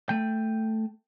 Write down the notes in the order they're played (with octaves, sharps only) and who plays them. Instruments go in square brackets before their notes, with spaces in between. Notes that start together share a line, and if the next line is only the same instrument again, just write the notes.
[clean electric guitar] A3 G5